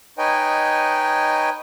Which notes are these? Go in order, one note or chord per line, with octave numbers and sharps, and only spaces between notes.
D#4 B4 C#5 D#5 G5 G#5